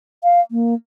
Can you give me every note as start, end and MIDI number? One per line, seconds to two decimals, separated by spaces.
0.24 0.41 77
0.51 0.74 58